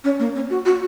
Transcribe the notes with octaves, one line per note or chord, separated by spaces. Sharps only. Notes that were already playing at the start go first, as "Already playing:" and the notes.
C#4
A#3
C#4
F#4
F#4